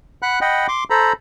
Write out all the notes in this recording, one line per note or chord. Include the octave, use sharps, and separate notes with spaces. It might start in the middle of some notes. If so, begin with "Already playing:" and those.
F#5 B5 F#6
D#5 F#5 G5 B5
C6 D6
A4 C5 A#5 B5